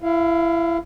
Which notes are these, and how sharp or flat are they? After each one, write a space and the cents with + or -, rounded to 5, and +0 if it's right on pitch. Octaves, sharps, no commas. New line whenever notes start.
E4 +25 F5 -5